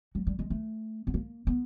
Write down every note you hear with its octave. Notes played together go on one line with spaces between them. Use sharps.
F#3
G3
G#3
A3
B3
A#3
B3